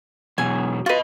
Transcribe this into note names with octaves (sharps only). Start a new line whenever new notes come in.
E2 B2 F#3 G#5
F4 F#4 B4 D#5